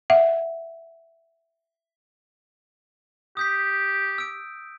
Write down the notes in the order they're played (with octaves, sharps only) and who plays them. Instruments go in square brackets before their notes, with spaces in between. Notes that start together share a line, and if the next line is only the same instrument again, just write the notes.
[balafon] E5 F#5
[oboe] G4 [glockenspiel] D#6 G6 B6
[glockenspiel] E6 D7